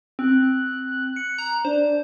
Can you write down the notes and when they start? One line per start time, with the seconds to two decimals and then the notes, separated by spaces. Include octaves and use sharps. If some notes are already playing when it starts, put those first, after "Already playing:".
0.19 C4 F#6
1.16 C#7
1.38 A#5
1.65 D4 C5